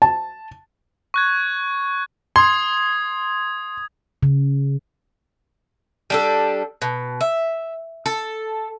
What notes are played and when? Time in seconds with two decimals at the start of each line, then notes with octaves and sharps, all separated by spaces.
0.02 A5
1.14 C#6 F#6 G#6
2.36 C6 D#6 G#6
4.23 C#3
6.10 G3 D4 A4
6.82 B2
7.21 E5
8.06 A4